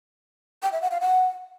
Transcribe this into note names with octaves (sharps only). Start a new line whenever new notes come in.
G5
E5
F#5
F5
F#5